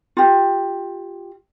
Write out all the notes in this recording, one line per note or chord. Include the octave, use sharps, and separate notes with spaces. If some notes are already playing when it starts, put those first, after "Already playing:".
F4 G4